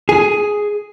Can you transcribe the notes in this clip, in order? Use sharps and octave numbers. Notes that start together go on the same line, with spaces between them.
G#4